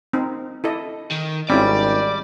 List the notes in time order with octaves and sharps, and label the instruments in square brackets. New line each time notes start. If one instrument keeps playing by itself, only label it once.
[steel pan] C4 D#4
E4 A4 D#5
[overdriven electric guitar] D#3
[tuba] G#1 [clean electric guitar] G3 [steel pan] C4 C#4 E4 [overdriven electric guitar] D5